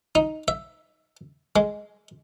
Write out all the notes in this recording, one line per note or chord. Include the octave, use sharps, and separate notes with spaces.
D#4
E5
G#3